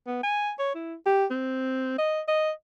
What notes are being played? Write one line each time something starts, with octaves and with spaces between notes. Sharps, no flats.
B3
G#5
C#5
E4
G4
C4
D#5
D#5